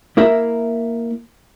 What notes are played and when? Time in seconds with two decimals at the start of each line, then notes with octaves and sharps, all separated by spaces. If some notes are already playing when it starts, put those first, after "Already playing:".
0.17 A#3 E4 A#4 E5